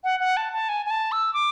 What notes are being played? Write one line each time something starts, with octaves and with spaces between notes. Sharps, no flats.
F#5
F#5
A5
A5
G#5
G#5
A5
E6
D6